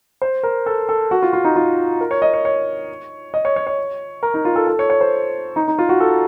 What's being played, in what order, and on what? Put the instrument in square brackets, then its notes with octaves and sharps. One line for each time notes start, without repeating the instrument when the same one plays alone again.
[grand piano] C5
A#4
A4
A4
F#4
F4
F4
D#4
F4
A#4
C#5
D#5
C#5
C#5
D#5
C#5
C#5
C#5
A#4
D#4
F4
A4
A4
C#5
C#5
C5
D#4
D#4
F4
F#4
A4